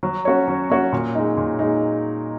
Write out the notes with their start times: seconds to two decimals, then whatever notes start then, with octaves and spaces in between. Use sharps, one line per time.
0.03 F#3
0.25 C#4 F#4 C#5
0.48 F#3
0.70 C#4 F#4 C#5
0.93 A#2
1.15 G#3 D#4
1.37 A#2
1.59 G#3 D#4